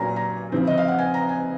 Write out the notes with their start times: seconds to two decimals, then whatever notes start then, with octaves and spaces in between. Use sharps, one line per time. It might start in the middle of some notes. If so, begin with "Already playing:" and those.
Already playing: A#2 F#3 A#3 C#4 G#5 A#5
0.16 A#5
0.52 C#3 F3 C4
0.67 D#5
0.78 F5
0.88 F#5
0.99 G#5
1.14 A#5
1.29 G#5